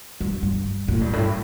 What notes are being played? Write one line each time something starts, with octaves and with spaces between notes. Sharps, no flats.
G2
G2
A2
G2
A2